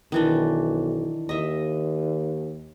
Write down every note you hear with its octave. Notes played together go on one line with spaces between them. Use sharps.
B1 D#3 E3 D4
D#2 D#5 E5